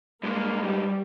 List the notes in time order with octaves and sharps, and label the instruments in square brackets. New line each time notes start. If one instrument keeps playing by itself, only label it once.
[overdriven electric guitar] G2 G#3 [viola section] A#3
[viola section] G3